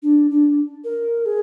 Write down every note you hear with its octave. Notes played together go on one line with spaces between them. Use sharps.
D4
D4
A#4
G#4